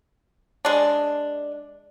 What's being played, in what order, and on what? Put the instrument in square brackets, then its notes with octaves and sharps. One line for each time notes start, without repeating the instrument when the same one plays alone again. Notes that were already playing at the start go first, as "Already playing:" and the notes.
[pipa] G#3 D4